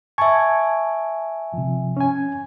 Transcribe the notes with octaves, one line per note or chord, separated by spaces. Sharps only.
E5 G#5 A5 C#6 G#6
C3 F3
C#4 G#5